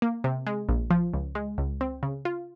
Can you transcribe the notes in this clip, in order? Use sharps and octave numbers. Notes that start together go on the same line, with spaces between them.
A#3
C3
G#3
A#1
F3
C#2
G#3
C#2
C4
C#3
F4